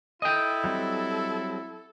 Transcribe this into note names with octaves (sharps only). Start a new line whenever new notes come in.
E4 A4 D#5 G5
F#3 G3 C4